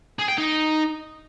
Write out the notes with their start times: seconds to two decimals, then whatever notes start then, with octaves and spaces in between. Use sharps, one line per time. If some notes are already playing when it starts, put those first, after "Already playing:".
0.19 G#4
0.28 G5
0.38 D#4